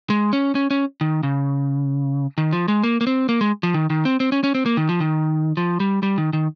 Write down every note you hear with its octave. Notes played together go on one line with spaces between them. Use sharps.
G#3
C#4
C#4
C#4
D#3
C#3
D#3
F3
G#3
A#3
A#3
C4
A#3
G#3
F3
D#3
D#3
C4
C4
C#4
C#4
C4
A#3
D#3
F3
D#3
F3
G3
G3
D#3
D#3